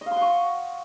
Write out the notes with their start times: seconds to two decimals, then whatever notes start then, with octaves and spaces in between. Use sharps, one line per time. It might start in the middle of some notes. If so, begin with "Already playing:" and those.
0.01 D#5
0.06 F5
0.11 C6
0.16 F#5
0.21 C#6